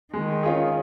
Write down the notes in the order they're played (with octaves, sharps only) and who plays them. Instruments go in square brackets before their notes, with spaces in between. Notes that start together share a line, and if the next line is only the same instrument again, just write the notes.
[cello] D#3 [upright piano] G#3
[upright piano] C#4 F4 G#4